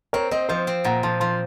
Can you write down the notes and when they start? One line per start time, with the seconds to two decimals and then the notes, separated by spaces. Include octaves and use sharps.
0.13 C4 A#4 C#5
0.31 C4 C5 D#5
0.49 F3 C5 D#5
0.67 C4
0.84 A#2 F#5 A#5
1.03 F3 A5 C6
1.20 F3 A5 C6